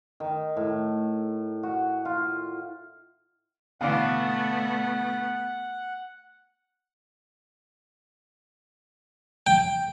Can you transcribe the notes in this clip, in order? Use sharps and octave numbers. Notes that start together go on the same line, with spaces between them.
D#3
A2
F#4
F4
B2 D3 E3 A3 B3 D5 F5 F#5
G5